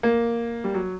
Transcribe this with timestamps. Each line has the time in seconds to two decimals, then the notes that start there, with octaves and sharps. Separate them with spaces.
0.03 A#3
0.64 G3
0.74 F#3